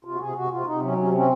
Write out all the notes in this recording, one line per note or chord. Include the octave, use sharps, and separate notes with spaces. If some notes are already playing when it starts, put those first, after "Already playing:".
C3 F4
F#4
C3 G#4
C3 F#4
C3 F4
C3 D#4
F#3 C#4
C3 C#4
C4 C#4